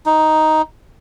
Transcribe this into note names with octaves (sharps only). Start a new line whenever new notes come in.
D#4